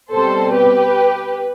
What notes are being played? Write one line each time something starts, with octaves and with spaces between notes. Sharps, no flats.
B2 G3 C4 A4 C5
G4 B4